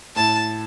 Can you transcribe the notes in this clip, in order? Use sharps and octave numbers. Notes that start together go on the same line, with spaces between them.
A2 A5